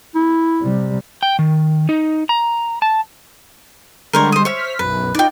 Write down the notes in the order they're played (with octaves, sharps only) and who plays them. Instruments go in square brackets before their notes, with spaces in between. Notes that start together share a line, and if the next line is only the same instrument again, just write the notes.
[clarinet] E4
[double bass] C3 G3
[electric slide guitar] G5
D#3
D#4
A#5
A5
[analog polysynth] D3 G3 G#3 [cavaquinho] A#4 C5 C#5
[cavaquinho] C5 D#6
[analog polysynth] C5 F6 B6 [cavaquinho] C#5 E5
[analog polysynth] B1 F#2 [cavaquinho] B4
[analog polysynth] D#4 F4 [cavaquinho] D5 G5